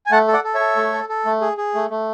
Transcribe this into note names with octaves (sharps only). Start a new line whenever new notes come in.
G#5
A3 F#5 A5
A4
D5 F#5
A4
C#5 E5
A4
A3
A4
A4
A3
G#4
G#4
A3
A3